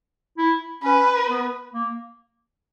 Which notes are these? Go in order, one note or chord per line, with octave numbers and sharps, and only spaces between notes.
E4
C#4 B4
B3
A#3